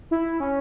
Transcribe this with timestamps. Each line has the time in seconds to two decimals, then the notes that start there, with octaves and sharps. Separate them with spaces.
0.11 E4
0.40 C#4